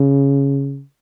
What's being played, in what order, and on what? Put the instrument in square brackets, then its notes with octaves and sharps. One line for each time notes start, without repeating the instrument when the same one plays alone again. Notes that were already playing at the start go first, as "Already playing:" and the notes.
Already playing: [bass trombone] C#3